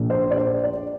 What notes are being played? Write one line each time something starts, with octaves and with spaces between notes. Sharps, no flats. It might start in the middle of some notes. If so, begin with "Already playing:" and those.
Already playing: A#1 A#2 F3
C5
D5
C5
D5